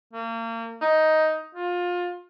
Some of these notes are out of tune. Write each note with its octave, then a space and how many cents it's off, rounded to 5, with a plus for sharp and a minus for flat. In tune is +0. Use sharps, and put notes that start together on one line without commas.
A#3 -35
D#4 +10
F4 +20